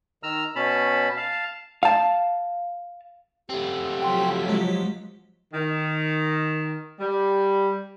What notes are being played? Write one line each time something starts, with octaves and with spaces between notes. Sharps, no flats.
D#3 A#5 E6 F6
B2 C#4 A5 B5
F5 A5
F5 A5
A3 C4 G4
F3 F#3 G5 C6 B6
G#3
D#3
G3